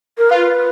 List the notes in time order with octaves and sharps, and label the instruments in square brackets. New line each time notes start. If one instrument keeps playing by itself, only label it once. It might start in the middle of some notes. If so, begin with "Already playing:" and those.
[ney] A#4
[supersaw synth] F4 [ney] B4